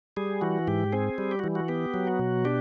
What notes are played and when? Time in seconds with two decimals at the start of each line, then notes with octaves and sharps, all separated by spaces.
0.17 G3 G#4
0.41 E3 F#4
0.67 G#2 G4
0.92 C4 G#4
1.18 G3
1.31 G4
1.39 F#4
1.44 E3
1.55 F#4
1.68 B3 G4
1.94 F#3
2.07 F#4
2.19 B2
2.45 D4 G4